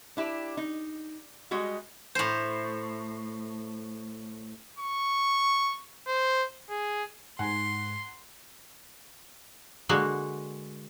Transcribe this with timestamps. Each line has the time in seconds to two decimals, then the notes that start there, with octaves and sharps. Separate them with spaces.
0.17 D4 E4 G4
0.57 D#4
1.51 G3 G#3 F#4 D#5
2.15 A2 C5
4.79 C#6
6.07 C5
6.70 G#4
7.39 G#2 F#5 G#5 A#5 C6
9.89 D3 G#3 A#3 F#4